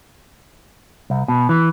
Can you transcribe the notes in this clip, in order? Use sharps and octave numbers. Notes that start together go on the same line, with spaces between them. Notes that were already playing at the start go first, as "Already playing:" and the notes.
C2
B2
E3